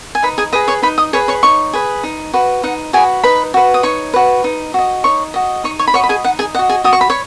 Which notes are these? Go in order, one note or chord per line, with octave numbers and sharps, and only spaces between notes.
G#5
D#4 B4 B5
G#4 G#5
G#4 B4 D#5 D#6
C#5 C#6
D#4 B4 B5
D#5 D#6
G#4 B4 C#5 C#6
C#5 C#6
D#4 C#5 C#6
G#4 B4
D#4
F#4 B4
D#4 F#5
F#4 G#4 B4 G#5
D#4 B4 B5
F#4 B4
D#6
D#4 C#5 C#6
F#4 B4
D#4
F#4 D#5
D#4 C#5 C#6
F#4 D#5
D#4 C#5 C#6
C#5 C#6
B5
F#4 C#5 D#5 C#6
B5
G#4 G#5
D#4 F#5
G#4 G#5
F#4 D#5 F#5
G#4 G#5
F#4 D#6
C#6
B5
C#5 C#6